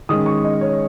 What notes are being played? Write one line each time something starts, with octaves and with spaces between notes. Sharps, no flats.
D#3 G#3 C#4 D#6
C#6
D#5
C#5